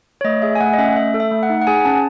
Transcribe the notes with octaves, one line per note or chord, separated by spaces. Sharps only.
C#5
A3 D#5
G#4 E5
G#5
A3 F#5
D#5
C#4 E5
A3 E5
A4
E5
A3
F#5
D#4
F#5
G#4 G#5
C#4 A5